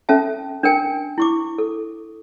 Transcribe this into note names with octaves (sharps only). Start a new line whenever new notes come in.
C#4 A4 E5 A5
D4 A#4 G5 G#5
E4 C#6 D6
A4